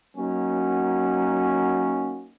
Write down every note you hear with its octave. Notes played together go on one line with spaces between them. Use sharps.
F#3 A#3 C#4 D#4 F#4